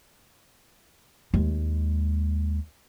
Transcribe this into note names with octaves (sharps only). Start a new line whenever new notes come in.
D#2 G#3